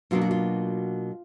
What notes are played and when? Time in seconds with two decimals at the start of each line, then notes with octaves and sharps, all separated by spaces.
0.11 B2 F#3 A#3 D4 F4
0.21 F#4
0.31 F4